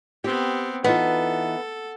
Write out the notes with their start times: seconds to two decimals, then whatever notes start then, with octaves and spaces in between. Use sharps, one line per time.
0.24 B3 C4 G4
0.84 E3 B3 D#4 F4 A4